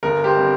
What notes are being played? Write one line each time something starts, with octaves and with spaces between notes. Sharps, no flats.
G1 A#4
G4 C5
G3 C4